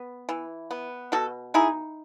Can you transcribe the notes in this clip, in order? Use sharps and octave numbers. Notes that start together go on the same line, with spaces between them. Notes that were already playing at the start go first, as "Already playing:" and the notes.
Already playing: B3
E3
B3
B2 F#4 A4
D#4 E4 G#4